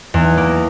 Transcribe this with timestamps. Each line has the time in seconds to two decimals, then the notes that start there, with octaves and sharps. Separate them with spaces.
0.14 E2
0.37 A#3